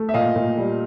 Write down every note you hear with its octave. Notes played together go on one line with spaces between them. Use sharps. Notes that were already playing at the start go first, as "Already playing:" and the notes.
Already playing: A3
E5
A#2 D#5 F5
A#2
G3